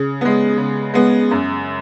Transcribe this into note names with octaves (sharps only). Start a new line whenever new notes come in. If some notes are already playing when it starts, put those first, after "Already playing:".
Already playing: C#3
G#3 B3
C#3
G#3 B3
F#2